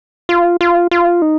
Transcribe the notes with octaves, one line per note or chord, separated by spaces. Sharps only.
F4
F4
F4
D#4